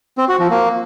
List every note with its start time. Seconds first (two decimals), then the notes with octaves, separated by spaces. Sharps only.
0.18 C4
0.29 F#4
0.40 F3
0.50 A#3